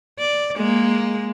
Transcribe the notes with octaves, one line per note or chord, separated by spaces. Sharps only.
D5
G#3 A#3